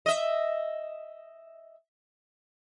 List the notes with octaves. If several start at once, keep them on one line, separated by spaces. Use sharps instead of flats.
D#5 E5